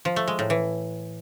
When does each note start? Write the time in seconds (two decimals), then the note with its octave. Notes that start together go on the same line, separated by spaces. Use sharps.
0.05 F3
0.16 A3
0.28 G#3
0.39 A2
0.50 E3